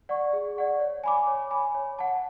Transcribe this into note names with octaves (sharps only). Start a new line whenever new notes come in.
D5 F#5 C#6
G#4
D5 F#5 C#6
C#5
G#5 B5 D6
C#5
G#5 B5 D6
C#5
F#5 A5